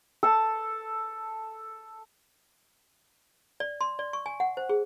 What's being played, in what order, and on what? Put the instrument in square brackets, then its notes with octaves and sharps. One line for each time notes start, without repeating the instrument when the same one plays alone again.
[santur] A4 A5
[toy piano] D5
C6
D5
C#6
G#5
F#5
C5
G#4